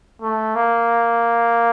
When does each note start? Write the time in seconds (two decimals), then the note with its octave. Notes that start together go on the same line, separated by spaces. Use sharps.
0.22 A3
0.55 A#3